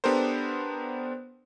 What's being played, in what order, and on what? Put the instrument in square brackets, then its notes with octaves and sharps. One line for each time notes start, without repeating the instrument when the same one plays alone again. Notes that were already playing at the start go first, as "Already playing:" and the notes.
[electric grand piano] B3 D4 G4 A4 A#4 C5